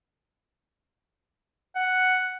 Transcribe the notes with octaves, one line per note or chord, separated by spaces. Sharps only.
F#5